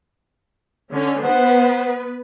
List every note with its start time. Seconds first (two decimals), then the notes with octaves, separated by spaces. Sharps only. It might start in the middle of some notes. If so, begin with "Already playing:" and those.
0.91 D3 C#4
1.23 B3 B4 C5 F#5